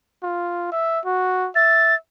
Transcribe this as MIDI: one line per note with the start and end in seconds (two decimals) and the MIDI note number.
0.23 0.70 65
0.72 1.00 76
1.05 1.49 66
1.55 1.96 76
1.55 1.95 93